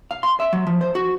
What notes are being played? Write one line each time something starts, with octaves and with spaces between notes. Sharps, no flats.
F5
C6
E5
F#3
F3
C5
F#4